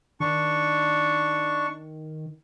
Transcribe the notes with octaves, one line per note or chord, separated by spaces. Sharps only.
D#3 D4 C#6